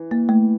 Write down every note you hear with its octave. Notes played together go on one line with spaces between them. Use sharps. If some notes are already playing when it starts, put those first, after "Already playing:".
Already playing: E3
A#3
A3